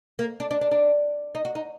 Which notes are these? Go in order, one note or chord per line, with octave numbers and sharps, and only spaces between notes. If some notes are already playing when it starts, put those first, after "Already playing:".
A#3
D4
D4
D4
D4
D#4
F#4
D#4